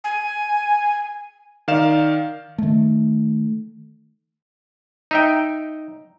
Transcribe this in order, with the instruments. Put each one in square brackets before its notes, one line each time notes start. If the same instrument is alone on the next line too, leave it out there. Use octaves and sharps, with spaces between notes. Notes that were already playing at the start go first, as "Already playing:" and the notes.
[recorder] G#5
[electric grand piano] D#3 D5 F5 E7
[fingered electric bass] D#3 A3
[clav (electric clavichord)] D#4 E5 G5